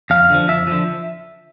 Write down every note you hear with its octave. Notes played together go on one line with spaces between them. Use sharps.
F2 F5
D3 F3
F2 E5
D3 F3